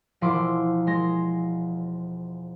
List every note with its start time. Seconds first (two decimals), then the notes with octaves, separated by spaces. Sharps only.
0.21 E1 F3 E4 C6 D6
0.87 G#3 C6 A#6